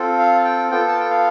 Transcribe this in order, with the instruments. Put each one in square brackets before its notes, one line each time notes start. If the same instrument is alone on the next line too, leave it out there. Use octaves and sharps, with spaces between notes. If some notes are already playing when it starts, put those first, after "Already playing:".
Already playing: [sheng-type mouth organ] C4 F4 A4
F5
G5
B3 F4 A4 G5
A5
G5
F5